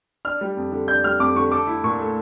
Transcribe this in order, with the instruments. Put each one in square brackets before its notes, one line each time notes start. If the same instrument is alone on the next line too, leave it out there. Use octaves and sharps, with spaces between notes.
[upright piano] D4 [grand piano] F6
[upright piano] G3
F2
D3
[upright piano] D4 [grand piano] G6
[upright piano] G3 [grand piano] F6
[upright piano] F2 [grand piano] D6
[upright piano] D3 [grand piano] C#6
[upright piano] A4 [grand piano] D6
[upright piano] E4
[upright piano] A#2 [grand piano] C#6
[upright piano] A3